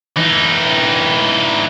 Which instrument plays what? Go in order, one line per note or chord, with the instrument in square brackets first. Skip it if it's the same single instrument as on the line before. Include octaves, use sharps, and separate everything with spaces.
[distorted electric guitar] E3 D#4